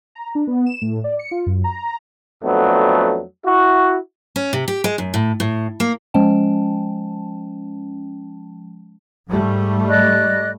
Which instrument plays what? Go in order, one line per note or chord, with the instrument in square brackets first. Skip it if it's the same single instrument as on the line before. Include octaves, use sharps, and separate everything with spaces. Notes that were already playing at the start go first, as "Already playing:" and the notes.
[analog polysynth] A#5
D4
B3
E7
A2
D5
C#7
F4
F#2
A#5
[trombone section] F2 F#3 A3 B3 D4
E4 F#4
[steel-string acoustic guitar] C#4
C3
G4
G#3
F#2
A2
A2
A#3
[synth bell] F3 G#3 C#4 G5 A5
[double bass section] G#2 G3 A3
[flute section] D5 D#5 F#6